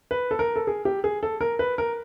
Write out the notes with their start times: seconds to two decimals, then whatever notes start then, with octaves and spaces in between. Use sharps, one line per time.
0.11 B4
0.31 A4
0.39 A#4
0.56 A4
0.67 G#4
0.85 G4
1.04 G#4
1.23 A4
1.41 A#4
1.59 B4
1.78 A#4